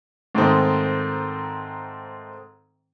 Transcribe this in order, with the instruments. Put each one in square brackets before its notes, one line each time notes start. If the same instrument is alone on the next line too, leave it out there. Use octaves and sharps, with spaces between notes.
[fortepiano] G#2 D#3 A3 C4 D#4